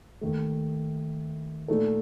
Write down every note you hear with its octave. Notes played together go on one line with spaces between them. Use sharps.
D#2 D#3 A3
A#2 A3 D#4 A4